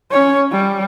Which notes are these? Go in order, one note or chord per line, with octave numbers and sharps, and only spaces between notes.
C#4 C#5
G3